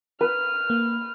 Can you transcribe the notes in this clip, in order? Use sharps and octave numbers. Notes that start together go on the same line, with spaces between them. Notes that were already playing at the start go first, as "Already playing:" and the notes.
B4 F6
A#3